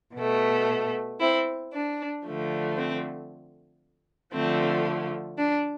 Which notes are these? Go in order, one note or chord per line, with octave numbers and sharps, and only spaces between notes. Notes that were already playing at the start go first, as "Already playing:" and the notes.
B2 A3
C4 E4
D4
D3 F3 A3
C4
D3 F3 A3 C4
D4